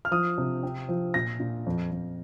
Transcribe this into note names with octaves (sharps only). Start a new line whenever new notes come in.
F6
F3 D#6
C3
C4
F3
A#2 A#6
A#2
F2
F2